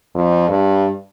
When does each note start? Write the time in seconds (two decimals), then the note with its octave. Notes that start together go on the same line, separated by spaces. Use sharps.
0.15 F2
0.49 G2